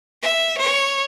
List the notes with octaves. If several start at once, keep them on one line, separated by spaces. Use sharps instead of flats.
E5
C#5